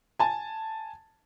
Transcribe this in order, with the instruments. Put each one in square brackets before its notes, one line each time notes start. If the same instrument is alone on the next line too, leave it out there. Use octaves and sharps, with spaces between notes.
[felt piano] G#5 A5